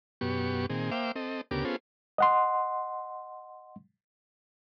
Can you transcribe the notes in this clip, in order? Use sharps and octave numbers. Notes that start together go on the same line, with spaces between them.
F#2 B2 B3 G4 C#6
A#2 D#3 C4 G#4
A#3 C5 E5 F5 G5 D6
C4 A4 D#5
D2 C#3 B3 G4 A#4 D6
B3 C#4 F4 G#4 A4 C5
D#5 F#5 C6